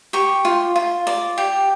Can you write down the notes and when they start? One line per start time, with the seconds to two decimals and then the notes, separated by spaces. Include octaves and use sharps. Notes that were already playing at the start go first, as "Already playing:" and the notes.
0.13 G4 C#6
0.45 F4
0.76 F4
1.07 D5
1.38 G4